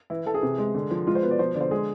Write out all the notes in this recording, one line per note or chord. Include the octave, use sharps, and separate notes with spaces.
E3 E4
E3 A4
G#4
C3
G#3
D3
F3
G#3 F4
C5
B2 B4
D5
F3 C5
D3 D5
C5
G#3 G#4